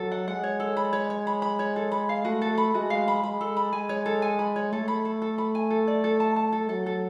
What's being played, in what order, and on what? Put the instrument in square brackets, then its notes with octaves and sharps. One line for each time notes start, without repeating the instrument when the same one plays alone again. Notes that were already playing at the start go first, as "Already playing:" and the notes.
Already playing: [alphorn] F#3 [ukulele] A4
[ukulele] F#5
[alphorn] G#3 [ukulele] F#5
[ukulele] C#5
A4
B5
C#5
C#5
B5
B5
C#5
A4
B5
F5
[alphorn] A3 [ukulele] F#4
[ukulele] A4
B5
[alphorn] G#3 [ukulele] F#4
[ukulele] F5
B5
[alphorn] G#3 [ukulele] B5
[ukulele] A4
B5
[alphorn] G#3 [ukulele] G#5
[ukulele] C#5
A4
G#5
B5
C#5
[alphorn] A3 [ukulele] A4
[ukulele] B5
A4
A4
B5
G#5
A4
D5
A4
A5
A5
A4
[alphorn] F#3 [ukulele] A4
[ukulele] A4